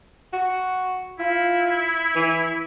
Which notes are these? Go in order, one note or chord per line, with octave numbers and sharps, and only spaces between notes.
F#4
E4 F4
E3